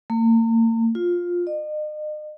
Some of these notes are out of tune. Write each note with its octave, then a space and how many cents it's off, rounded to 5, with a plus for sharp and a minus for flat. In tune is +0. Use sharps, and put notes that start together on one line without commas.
A#3 -40
F4 +10
D#5 -40